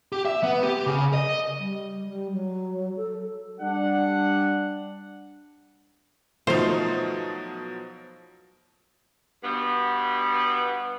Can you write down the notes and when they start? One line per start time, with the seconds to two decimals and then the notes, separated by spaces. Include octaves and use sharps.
0.12 G4
0.25 E5
0.43 B3
0.63 G4
0.87 C#3
1.14 D#5
1.59 G3
2.07 G3
2.33 F#3
2.97 A4
3.60 G3 D4 F#5
6.47 B2 F3 F#3 A3 D#4 C5 F5
9.44 G2 B2 B3